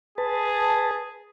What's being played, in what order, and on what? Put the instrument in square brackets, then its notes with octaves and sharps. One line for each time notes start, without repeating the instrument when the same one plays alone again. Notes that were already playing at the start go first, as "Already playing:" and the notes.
[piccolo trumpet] G#4 [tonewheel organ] B4 A5